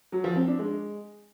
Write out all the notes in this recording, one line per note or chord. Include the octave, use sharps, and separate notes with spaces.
F#3
F3
C4
D4
G#3